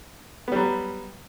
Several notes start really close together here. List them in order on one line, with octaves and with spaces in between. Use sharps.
B3 G3 F#3